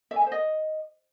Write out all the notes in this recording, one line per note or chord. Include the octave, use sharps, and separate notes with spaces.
E5
G#5
E5
C5
D#5